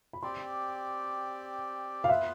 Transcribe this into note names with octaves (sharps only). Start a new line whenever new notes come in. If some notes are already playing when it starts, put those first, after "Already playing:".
B5
C4 G4 D5 C6
F5
B3 F4 B4 E5